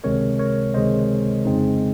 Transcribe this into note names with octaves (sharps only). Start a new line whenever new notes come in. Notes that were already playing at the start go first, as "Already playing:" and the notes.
C#2 C3 D#3 G#3 C4 A#4 C#5
A#4 C#5
C#2 C3 D#3 G#3 C4 C5 D#5
F2 C#3 G#3 C4 D#4